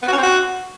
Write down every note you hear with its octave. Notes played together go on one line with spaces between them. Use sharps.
B3
F#4
C#4
C4
F#4